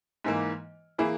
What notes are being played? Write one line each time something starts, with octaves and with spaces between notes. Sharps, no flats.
G#2 E3 A#3
E3 A#3 E4 G#4